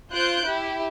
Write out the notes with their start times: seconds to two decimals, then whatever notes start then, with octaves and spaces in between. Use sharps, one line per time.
0.11 F4 C5 F#6 G6 D7
0.45 E4 G4